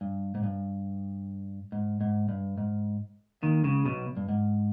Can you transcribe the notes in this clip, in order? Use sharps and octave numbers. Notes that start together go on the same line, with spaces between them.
G2
G#2
G2
G#2
G#2
G2
G#2
D#2 D#3
C#2 C#3
B1 B2
G2
G#2